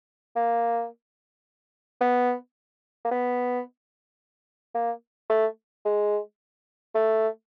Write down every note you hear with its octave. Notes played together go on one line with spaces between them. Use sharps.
A#3
B3
A#3
B3
A#3
A3
G#3
A3